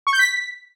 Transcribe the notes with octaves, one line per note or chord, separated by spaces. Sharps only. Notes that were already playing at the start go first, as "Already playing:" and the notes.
C#6
G6
B6